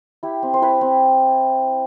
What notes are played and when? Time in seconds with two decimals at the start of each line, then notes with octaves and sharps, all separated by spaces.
0.23 E4 G4
0.43 C4
0.54 C5
0.62 E4 B4
0.81 C4